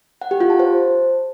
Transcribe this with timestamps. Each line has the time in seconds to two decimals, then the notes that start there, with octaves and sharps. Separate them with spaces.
0.21 F#5
0.31 G4
0.40 F4
0.50 A5
0.59 C5